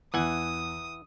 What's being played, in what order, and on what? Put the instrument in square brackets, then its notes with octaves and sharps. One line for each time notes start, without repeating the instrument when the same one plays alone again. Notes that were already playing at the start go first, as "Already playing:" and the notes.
[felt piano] E2 [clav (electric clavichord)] E3 F#5 G#5 [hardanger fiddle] D#6